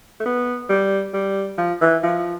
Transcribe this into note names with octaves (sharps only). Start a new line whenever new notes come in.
A3
B3
G3
G3
F3
E3
F3